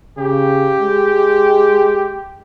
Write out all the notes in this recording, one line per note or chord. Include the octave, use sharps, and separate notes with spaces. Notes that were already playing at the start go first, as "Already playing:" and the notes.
C#3 G4
G#3